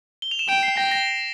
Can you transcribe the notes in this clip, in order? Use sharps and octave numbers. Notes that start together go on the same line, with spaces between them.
G7
F7
E7
G5 D7
C7
G5 A#6
A#6